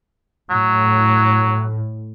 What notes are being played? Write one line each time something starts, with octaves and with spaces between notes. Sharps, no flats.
A2 F#3